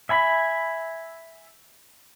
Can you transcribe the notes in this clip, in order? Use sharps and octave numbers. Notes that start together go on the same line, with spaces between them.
E5 G#5 B5